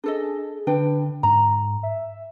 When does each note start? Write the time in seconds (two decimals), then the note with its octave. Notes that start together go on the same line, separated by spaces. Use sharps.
0.04 D4 G#4 A4 D#5
0.67 D3 D4 B4 G5
1.23 G#2 A#5
1.83 E5